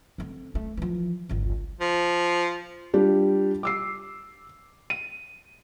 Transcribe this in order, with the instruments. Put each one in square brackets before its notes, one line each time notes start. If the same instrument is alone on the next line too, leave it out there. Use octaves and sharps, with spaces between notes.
[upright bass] D3 C4
A3
E3 F3
G1 C#2
[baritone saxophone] F3
[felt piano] G3 D4 F4 G4
D6 E6 C7
D#7